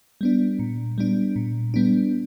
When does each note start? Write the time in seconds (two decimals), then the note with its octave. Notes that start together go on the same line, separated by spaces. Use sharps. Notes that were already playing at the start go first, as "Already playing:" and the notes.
0.21 G3 B3 D4
0.59 A#2
0.98 G3 B3 D4
1.36 A#2
1.74 G3 B3 D4